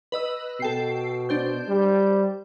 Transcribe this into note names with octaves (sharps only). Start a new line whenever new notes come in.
B4 D#5 E6
B2 A4 G5 C7
D4 C5 G6
G3